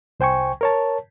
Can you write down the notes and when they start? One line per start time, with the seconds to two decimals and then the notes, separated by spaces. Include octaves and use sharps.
0.20 C2 C5 G5 G#5 C#6
0.61 A#4 C#5 A5